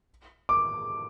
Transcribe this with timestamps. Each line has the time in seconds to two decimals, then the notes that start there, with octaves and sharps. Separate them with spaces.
0.49 D6